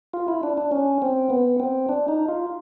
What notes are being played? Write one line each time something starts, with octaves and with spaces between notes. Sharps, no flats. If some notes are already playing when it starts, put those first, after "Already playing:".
F4
E4
D4
D4
C#4
C4
B3
C4
D4
D#4
F4